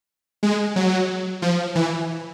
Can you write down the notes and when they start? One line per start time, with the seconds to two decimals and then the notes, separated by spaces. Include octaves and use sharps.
0.43 G#3
0.76 F#3
1.42 F3
1.75 E3